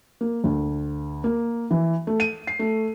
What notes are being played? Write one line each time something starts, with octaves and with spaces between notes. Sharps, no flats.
A#3
D2
A#3
E3
A3
D#7
C7
A3